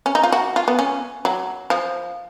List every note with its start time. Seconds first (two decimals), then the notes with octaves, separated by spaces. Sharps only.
0.06 C#4
0.15 D#4
0.23 F4
0.32 F#4
0.56 F4
0.68 B3
0.79 C#4
1.25 F#3
1.70 F3